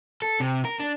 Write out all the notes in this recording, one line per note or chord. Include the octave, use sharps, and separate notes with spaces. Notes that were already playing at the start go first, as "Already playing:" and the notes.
A4
C3
A#4
D4